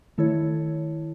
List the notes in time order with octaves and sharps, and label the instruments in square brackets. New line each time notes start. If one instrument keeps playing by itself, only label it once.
[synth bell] D#3 A3 E4 A4 C#5